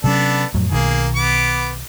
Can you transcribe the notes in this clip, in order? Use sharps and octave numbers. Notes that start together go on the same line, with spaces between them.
C3 F#3 B3 C#4 D4 A4
F2 A2 F#3
B1 B2 D#3 A#3 G#4
B3 D6